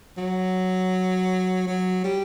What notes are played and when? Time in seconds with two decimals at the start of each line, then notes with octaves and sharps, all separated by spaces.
0.18 F#3
1.67 F#3
2.04 G3